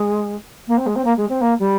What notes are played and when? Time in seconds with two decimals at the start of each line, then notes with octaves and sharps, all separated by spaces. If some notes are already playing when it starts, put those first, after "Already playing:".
Already playing: G#3
0.67 A#3
0.77 C4
0.86 G#3
0.95 C4
1.04 A#3
1.16 G#3
1.29 C4
1.41 A#3
1.59 G3